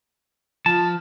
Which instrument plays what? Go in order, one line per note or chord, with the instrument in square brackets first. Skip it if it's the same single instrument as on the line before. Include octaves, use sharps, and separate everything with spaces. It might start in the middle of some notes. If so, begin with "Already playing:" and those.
[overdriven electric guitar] F3 [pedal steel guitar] A5